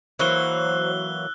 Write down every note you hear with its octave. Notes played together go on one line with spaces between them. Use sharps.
E3 F#3 A#3 C5 E6 F#6 G7